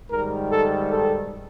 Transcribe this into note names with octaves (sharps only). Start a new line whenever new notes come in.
G#2 D#3 G3 A#4
A4
A4